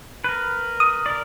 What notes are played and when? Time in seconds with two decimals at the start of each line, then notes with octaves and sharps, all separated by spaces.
0.24 A#4 B4
0.80 D#6
1.06 A#4 D5